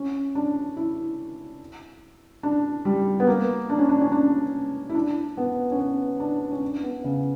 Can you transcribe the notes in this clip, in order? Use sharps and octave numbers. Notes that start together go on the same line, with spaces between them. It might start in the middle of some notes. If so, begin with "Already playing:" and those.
Already playing: C#4
D4
E4
D4
G3
B3
A#3
D4
C#4
D4
C#4
D4
E4
D4
B3
C#4
B3
D4
C#4
D4
B3
C#3